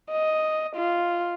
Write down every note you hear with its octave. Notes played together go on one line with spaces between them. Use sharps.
D#5
F4